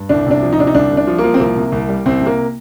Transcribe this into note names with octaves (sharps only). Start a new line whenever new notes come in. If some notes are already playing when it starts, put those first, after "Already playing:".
Already playing: G2
C2 D4
C3 D4
F3
D#4
C3 D4
D#4
C2 D4
C2
D4
F3
A#3
F3
C4
C2 A#3
C3
C2
G3
C2 C4
C3
A#3